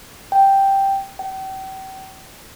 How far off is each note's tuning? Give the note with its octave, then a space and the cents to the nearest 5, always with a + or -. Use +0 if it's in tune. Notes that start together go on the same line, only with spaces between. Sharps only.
G5 +0
G5 -40